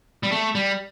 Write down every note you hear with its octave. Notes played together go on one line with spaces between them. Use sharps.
G3
A3
G3